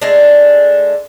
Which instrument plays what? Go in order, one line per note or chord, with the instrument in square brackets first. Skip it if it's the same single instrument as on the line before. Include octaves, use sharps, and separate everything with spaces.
[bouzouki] G#3 A3 D4